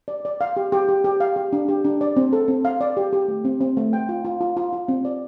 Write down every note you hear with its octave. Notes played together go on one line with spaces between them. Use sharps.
D5
D5
F5
G4
G4
G4
G4
F5
G4
D4
G4
D4
D5
C4
A4
C4
F5
D5
G4
G4
A3
C4
C4
A3
G5
F4
F4
F4
F4
F4
C4
D5